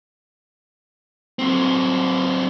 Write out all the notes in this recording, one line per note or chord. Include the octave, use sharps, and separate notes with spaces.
F#3 C4